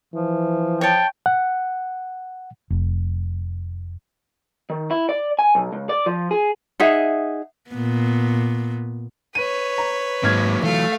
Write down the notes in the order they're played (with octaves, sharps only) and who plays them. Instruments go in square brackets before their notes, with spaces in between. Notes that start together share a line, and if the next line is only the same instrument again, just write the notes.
[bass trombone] E3 [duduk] F3
[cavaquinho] C#5 A5 [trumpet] G5
[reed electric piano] F#5
[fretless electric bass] F1
[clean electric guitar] D#3
E4
D5
G#5
B1
C#2
D5
F3
G#4
[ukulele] D#4 G#4 E5 F#5
[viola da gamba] A#2 B3
[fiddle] B4 C#5 [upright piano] D#7
[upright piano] A#5
[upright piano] G#1 F6 G#6 [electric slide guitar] G#2 [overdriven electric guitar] F#3 A#3
[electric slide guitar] E3 F#3 [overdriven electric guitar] A3 [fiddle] F5